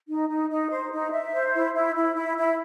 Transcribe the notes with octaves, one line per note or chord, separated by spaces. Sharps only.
D#4
D#4
D#4
C5
D#4
E5
C5
E4
E4
E4
E4
E4